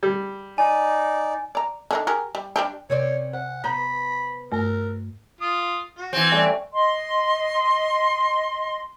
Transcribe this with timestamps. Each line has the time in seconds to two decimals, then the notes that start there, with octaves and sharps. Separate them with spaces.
0.03 G3
0.58 D#4 D5 G#5
1.55 D5 A#5
1.91 D3 D4 D#4
2.07 G4 G#4 A#4
2.35 G3
2.56 G3 D4 G4
2.90 C3 C4 C#4 C#5 D5
3.34 C5 F#5
3.64 B3 B4 C5 A#5 B5
4.52 G2 A3 A#4
5.41 F4 D#6
5.98 F#4
6.13 E3 C4
6.31 G3 A3 C#4
6.73 D#5 C6